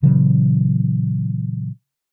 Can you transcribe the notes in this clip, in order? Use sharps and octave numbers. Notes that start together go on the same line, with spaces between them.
A#2 C#3 E3 F#3